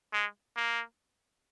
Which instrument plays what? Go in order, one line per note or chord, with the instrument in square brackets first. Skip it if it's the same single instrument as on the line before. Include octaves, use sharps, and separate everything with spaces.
[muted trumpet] G#3
A#3